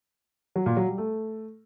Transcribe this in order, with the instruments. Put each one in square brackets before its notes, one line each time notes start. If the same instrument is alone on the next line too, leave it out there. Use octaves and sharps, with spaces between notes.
[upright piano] F#3
A#2
F#3
G3
A3